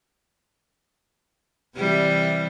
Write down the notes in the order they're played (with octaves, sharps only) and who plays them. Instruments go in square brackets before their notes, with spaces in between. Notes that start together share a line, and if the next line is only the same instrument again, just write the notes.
[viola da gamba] C3 E3 G3